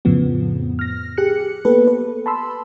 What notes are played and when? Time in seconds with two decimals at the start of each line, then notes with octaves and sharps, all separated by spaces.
0.05 F2 A2 C#3 F3 B3
0.79 F6 A#6
1.18 G4 G#4 F#6 C#7
1.65 A#3 B3 G4 A4 B4
1.88 B4
2.26 A5 B5 C6 E6